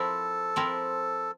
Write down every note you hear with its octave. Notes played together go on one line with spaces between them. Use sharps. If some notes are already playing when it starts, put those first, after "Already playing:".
Already playing: F3 C4 E4 A4 A#4
F3 C4 E4 A#4